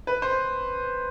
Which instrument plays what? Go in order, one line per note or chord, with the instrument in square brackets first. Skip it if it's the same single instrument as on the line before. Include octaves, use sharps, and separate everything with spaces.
[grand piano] B4
C5